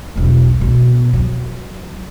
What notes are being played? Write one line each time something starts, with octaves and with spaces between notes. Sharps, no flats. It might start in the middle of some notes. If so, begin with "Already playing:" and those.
E1 B1
B2
F#3